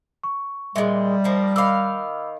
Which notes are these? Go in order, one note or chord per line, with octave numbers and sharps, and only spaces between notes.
C#6
A#2 G3 G#3 D#5 E5
F3 A#3
D#3 F5 B5 D6 E6